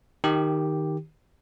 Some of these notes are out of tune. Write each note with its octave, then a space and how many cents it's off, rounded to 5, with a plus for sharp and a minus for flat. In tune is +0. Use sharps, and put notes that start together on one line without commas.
D#3 -5 G4 +0